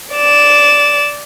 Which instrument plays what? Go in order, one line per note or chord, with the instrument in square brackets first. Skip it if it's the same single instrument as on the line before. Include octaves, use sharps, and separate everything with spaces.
[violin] D5 E7